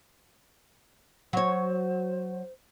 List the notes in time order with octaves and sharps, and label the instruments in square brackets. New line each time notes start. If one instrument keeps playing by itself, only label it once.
[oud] F#3 C#5 [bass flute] C5